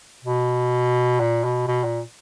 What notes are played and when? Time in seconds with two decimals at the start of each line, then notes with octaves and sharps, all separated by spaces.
0.24 B2
1.20 A#2
1.44 B2
1.67 B2
1.84 A#2